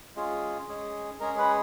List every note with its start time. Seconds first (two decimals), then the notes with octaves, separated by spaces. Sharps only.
0.16 G#3 C#4 F4 G#4
0.69 G#3 C#4 G#4
1.20 G#3 C#4 G#4 A#4
1.38 B4